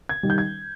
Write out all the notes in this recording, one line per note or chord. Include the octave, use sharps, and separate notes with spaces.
G#6
D#3 G3
G6
G#6